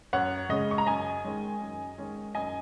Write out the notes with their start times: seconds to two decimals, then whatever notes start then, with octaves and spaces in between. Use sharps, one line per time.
0.13 F#2 C#5 F#5
0.49 C#3 G#3 C#4 D#5
0.71 C#6
0.78 A#5
0.87 F#2 D#5 G#5
1.24 D#3 G#3 C#4
1.61 F#2
1.98 D#3 G#3 C#4
2.35 F#2 D#5 G#5